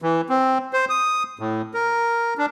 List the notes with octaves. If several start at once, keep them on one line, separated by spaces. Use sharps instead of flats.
E3
C4
C5
D#6
A2
A#4
D4